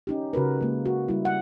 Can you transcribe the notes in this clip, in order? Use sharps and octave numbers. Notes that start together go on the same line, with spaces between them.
C#4 D#4 G4
C#3 F#4 A#4 B4
G#3 A#3
F#4
G3 E4
F#5